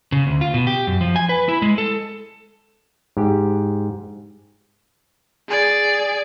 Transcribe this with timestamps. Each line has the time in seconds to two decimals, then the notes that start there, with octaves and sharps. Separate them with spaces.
0.12 C#3
0.27 D2
0.41 F4
0.54 B2
0.67 G4
0.87 F#2
1.01 F3
1.16 G#5
1.29 B4
1.49 E4
1.62 G#3
1.78 A4
3.17 G#2 G4
5.48 G#4 D5